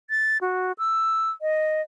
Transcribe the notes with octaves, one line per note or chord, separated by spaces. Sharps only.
A6
F#4
E6
D#5